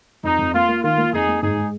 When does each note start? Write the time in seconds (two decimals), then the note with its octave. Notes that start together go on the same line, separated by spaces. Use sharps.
0.23 F2 D#4
0.39 F2
0.53 A#3 F4
0.68 A#3
0.83 D#3 F4
0.97 A#3
1.12 F2 D#4 G#4
1.27 A#3
1.42 G#2 D#4 G#4
1.57 G#3